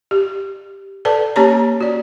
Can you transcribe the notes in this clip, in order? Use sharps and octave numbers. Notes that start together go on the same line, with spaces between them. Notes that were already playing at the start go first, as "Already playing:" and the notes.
G4
A4 B4 D5 A5
A#3 C#4 G4 C#5 A5 A#5
F#4 D5